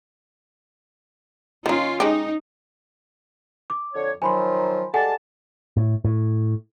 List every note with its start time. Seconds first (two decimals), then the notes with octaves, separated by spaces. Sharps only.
1.66 D#3 C#4 D#4 F4
2.00 G#3 D#4 G4
3.70 D6
3.94 F2 D3 C#5
4.22 D#3 F3 F#3 G#5 B5 C6
4.94 G3 G#3 A4 F#5 G#5 A5
5.77 A2
6.05 A2